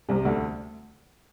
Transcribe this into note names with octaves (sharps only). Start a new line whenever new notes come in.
C2 C3
D2 D3